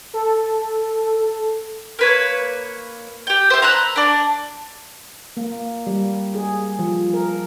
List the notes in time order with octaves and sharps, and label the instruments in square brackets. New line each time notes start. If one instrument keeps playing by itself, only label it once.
[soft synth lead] A4
[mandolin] A#3 B4 C#5
G4 G5
E4 C5
A#5 B5 E6 F#6
D4 D5
[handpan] A#3
G3
G#4
F3
A#4